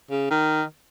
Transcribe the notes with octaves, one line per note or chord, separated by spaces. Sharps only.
C#3
D#3